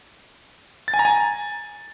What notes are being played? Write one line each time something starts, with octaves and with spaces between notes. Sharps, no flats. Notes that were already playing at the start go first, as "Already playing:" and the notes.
A6
G#5
A#5
G#5